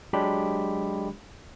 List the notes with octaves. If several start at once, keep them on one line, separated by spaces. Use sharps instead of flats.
F#3 G#3 D4 G4 B5